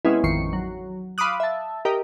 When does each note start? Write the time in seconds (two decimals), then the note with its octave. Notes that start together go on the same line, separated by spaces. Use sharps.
0.05 C3 G#3 B3 C#4 E4
0.23 A1 F2 D#3 C#6 C7 C#7
0.53 F#3
1.18 F5 B5 C6 D6 D#6 F#6
1.40 E5 A5
1.85 G4 A#4 D#5